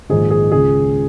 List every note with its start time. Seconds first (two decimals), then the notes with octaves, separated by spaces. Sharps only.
0.10 A#1 G#2 D#3 G#4
0.30 G#4
0.52 C#2 C#3 G#4